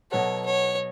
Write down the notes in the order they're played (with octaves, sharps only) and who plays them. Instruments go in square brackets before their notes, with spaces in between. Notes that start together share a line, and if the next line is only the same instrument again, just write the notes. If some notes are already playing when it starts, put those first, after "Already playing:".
[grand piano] B2 F#3 B3 F#4 A4 [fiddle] C#5
[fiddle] C#5